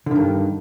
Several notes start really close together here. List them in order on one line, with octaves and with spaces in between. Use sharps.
D3 D#3 G2